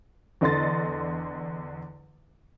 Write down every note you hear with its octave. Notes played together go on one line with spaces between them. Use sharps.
E2 D3 D5 D#5 C6 A6